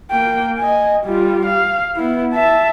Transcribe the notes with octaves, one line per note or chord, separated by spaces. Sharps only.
A#3 G5
D#5 G#5
G3 F4
F5
B3 E4
E5 A5